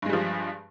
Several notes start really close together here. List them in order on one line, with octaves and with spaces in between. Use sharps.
G2 G#3 G3 F3